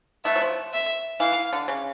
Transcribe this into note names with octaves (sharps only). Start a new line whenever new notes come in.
A3 B3 E5
F#3
F3
E5
E3 F5
D3
C#3